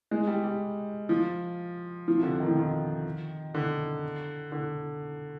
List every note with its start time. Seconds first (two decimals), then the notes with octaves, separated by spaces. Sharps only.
0.11 G#3
0.27 G3
0.44 G3
1.09 F3
2.08 F3
2.18 C3
2.23 D3
2.40 D#3
2.48 F3
2.56 D#3
3.54 D3
4.52 D3